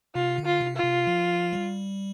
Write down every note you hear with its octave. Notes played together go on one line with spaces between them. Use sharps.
C3 F4
D3
F4
C3
F4
C3
F3
G3